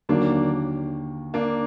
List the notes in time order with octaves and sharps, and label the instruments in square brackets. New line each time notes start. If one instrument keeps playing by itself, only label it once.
[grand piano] D#2 D3 F#3 [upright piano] A#3 D4
[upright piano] A#3 D4